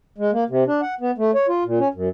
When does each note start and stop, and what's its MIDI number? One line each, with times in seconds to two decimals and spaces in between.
0.18 0.31 56
0.33 0.44 58
0.50 0.64 48
0.67 0.81 62
0.82 0.94 78
1.00 1.11 59
1.18 1.31 57
1.34 1.47 73
1.48 1.64 65
1.65 1.79 46
1.79 1.88 61
1.94 2.09 42